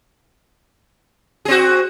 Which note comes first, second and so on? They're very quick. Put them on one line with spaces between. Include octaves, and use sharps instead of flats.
G#4 C4 F#4